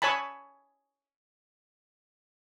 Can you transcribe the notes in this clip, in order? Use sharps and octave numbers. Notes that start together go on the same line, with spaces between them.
C#5 G#5 A5 B5